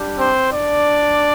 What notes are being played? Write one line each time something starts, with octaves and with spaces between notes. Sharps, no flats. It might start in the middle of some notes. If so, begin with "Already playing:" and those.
Already playing: G3 D4 G4
C4 C5
D4 D5